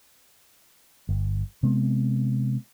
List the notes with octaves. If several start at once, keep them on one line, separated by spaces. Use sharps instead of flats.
G1
C3 G#3 B3 C4